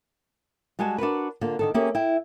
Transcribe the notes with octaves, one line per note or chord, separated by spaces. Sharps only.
G3 G#3 F#4 G#5 A5
D4 F#4 A#4 B4
D3 A#3 F4
D3 D#3 A4
A#3 C#4 G4 G#4 E5
E4 G5